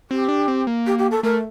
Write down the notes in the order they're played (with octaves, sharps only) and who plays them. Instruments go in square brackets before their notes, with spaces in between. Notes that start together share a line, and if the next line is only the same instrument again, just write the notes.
[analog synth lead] C4 [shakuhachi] G4
[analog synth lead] D4
C4
A#3
[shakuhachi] G4
G4
A4
[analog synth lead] A3 [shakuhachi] A#4